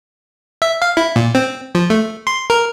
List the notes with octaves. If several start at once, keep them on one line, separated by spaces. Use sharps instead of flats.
E5
F5
E4
A#2
C4
F3
A3
C6
A#4